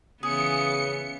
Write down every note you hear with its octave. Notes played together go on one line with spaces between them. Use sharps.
C#3 E3 B3 G#4 C#7